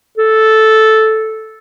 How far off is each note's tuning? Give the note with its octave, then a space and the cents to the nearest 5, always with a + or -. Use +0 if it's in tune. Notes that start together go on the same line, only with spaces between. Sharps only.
A4 -5